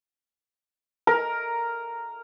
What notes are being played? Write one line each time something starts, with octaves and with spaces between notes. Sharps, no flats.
A#4